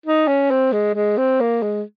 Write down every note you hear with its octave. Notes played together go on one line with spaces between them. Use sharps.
D#4
C#4
C4
G#3
G#3
C4
A#3
G#3